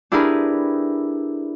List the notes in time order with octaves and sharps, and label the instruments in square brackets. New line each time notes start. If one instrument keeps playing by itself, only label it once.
[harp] D4 E4 G4 G#4 A#4 B4